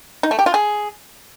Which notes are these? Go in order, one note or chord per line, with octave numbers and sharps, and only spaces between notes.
D#4
A3
G4
F4
G#4